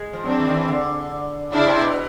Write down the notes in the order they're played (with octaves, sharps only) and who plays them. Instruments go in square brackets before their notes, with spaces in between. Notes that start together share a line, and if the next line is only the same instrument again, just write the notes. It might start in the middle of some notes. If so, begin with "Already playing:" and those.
Already playing: [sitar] G#3
F3
[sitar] F#3 [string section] C4 D4
[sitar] E3
D#3
E3
D3
[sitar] C#3 [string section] D4 E4
[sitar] C3
B2